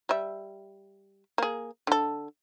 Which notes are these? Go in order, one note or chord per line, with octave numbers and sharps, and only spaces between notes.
G3 E5
A#3 G#4
D3 A4